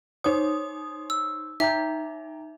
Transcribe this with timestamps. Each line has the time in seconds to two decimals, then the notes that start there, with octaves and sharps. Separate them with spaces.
0.24 D#4 C5 C#5 D#6
1.10 E6
1.60 D#4 E5 G5 A#5 G6